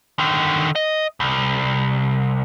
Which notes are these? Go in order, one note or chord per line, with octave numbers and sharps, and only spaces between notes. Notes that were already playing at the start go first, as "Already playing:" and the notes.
D3 D#3
D#5
C2